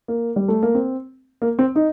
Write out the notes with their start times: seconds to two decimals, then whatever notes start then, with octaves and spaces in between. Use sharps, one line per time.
0.08 A#3
0.36 G3
0.48 A3
0.63 A#3
0.75 C4
1.42 A#3
1.59 C4
1.76 D#4